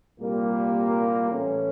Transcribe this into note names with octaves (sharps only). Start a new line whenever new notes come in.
C2 A#2 G3 A#3
A2 E3 A3 C#4